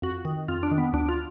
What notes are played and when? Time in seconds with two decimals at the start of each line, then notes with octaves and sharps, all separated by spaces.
0.02 F2 F#4
0.25 D#3
0.48 F2 F4
0.63 D4
0.71 D#3
0.78 B3
0.93 D2 D4
1.09 F4